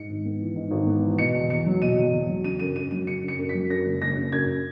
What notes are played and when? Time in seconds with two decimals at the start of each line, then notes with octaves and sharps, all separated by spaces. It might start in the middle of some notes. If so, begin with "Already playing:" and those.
Already playing: G#2 C#7
0.08 G#1
0.25 B3
0.40 E3
0.56 G#2
0.71 G#1
0.87 B3
1.03 E3
1.18 B2 C#7
1.35 E2
1.49 E2 C#7
1.66 F#3
1.81 B2 D#7
1.97 E2
2.13 E2
2.29 F#3
2.44 C#3 D#7
2.59 F#2 D#7
2.76 F#2 D#7
2.91 F#3 D#7
3.07 C#3 C#7
3.23 F#2
3.28 C#7
3.38 F#2
3.49 B6
3.55 F#3
3.70 F#2 A#6
3.86 F#1
4.02 F#1 A#6
4.17 C#3
4.32 F#2 G#6